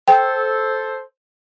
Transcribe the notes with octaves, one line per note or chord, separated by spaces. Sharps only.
A4 C5 G5